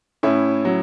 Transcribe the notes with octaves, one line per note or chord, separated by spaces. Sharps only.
A2 C#4 E4
F#3